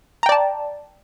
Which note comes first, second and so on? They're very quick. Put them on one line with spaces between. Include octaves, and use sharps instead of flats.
A#5 G5 D5 A5